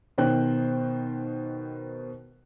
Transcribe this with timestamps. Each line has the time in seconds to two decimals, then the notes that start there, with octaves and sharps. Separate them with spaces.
0.18 B2 D#3 C5 G5 F#6